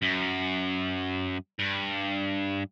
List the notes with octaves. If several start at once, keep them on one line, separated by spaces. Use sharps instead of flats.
F#2
G2